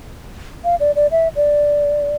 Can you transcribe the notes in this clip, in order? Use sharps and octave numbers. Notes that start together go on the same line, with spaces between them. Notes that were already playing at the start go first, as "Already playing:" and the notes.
F5
D5
D5
E5
D5